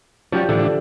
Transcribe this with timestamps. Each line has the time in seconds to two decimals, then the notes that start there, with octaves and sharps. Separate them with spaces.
0.32 F3 F#3 C#4 G4 D5
0.49 A2 D3 E3 D4